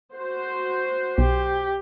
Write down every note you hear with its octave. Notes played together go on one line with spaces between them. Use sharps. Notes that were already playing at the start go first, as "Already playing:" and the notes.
F#4 C5
B1 G4